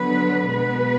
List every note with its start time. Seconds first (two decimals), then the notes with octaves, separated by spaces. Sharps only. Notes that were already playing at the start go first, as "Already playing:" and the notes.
Already playing: D3 F#3 B3 B4
0.48 B2 G#3 B3 B4